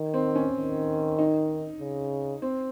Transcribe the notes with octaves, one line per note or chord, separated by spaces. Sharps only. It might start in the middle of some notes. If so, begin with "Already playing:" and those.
Already playing: D#3
C4
C#4
D#3
D#4
C#3
C4